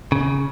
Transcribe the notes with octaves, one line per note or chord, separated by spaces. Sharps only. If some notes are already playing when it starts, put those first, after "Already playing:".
C#3